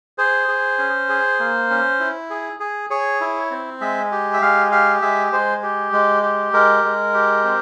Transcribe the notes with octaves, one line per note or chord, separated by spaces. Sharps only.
G#4 C5
G#4
C#4
G#4
A#3
C#4
E4
G#4
G#4
G#4 C#5
E4
C4
G#3 E5
G4
E5
G#3 F5
G4 F5
G#3 E5
G#3 C5
G4
G#3
G4
G#3 A#4
G#3
G4
C4